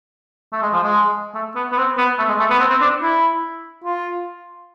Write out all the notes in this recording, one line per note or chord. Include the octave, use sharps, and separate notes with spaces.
A3
G#3
F3
G#3
A3
B3
B3
C4
B3
A3
G#3
A3
B3
C4
C4
D4
E4
F4